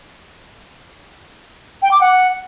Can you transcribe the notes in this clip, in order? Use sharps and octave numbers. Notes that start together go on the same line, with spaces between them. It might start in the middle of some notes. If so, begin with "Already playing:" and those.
G5
D6
F#5